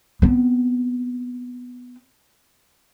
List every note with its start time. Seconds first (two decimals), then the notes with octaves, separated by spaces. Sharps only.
0.22 B3 C4